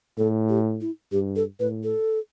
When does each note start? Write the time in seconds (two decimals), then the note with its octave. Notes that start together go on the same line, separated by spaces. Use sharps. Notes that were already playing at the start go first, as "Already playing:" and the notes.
0.17 A2 A4
0.49 G4
0.81 E4
1.12 G2 G4
1.36 A4
1.60 A2 B4
1.83 A4